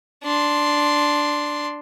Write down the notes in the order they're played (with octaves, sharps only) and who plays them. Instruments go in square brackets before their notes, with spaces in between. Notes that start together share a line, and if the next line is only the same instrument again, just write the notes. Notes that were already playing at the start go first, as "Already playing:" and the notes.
[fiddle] D4 C6